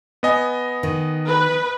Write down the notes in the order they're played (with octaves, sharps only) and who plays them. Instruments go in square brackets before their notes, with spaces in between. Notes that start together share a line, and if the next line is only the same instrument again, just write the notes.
[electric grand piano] B3 D#5 G#5
[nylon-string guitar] D#3
[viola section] B4